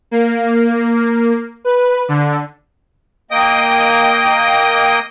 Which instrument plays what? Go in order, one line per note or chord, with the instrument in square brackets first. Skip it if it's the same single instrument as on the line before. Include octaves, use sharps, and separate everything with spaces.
[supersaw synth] A#3
B4
D3
[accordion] A#3 D#5 G5 D#6